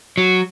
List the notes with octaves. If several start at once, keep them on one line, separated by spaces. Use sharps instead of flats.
F#3